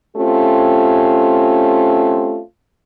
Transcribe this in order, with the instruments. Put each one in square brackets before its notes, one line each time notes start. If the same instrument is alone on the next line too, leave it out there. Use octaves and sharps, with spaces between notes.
[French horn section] A3 C4 C#4 F4 G4